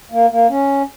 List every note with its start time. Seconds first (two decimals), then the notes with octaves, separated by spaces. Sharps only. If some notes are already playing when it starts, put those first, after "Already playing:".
0.12 A#3
0.30 A#3
0.49 C#4